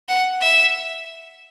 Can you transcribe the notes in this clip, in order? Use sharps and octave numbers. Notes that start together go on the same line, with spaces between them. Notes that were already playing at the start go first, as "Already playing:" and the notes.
F#5
E5